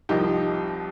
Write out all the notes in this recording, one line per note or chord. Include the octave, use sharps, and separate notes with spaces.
C2 C3 F3 D#4 G4